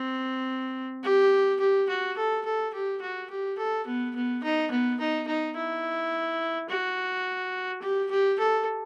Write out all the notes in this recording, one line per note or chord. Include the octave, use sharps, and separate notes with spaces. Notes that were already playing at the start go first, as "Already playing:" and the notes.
Already playing: C4
G4
G4
F#4
A4
A4
G4
F#4
G4
A4
B3
B3
D#4
B3
D#4
D#4
E4
F#4
G4
G4
A4